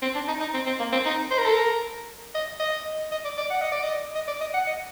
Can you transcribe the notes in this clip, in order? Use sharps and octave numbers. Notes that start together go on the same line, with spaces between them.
C4
D4
D#4
D#4
C4
C4
A#3
C4
D#4
C5
A#4
A4
A#4
D#5
D#5
D#5
D5
D5
F#5
D#5
D5
D#5
D#5
D5
D#5
F#5
D#5